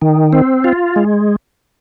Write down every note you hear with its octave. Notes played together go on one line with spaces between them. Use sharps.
D#3
C4
F4
G#3